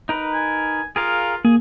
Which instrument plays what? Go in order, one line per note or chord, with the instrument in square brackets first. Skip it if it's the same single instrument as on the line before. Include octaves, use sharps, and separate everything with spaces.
[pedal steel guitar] D#4 A#4 B4
[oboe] G#5
[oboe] F4 [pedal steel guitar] G#4 A#4 F5
[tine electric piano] A#3 [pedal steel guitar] G#4